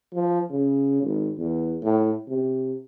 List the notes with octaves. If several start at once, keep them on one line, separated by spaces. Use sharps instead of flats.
F3
C#3
G#1
E2
A2
C3